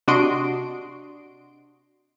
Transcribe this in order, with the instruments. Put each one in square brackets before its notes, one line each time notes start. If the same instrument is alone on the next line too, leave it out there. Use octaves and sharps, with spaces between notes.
[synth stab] C3 D4 F#4 D#5 C6 D7